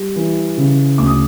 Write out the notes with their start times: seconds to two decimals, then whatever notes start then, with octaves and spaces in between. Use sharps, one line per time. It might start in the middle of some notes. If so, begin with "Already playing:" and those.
Already playing: G3
0.16 E3
0.57 C#3
0.98 D2 D6
1.06 D#6